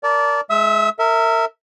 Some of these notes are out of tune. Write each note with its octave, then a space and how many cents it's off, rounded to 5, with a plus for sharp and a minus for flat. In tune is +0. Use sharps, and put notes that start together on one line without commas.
A#4 +0 D5 -25 A5 +0
G#3 +25 E5 +0 E6 -45
A#4 -30 E5 -10